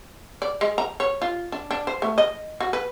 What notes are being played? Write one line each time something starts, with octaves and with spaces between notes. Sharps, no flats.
D5
G#3
A#5
C#5
F4
D4
D4
C5
A3
D#5
F#4
B4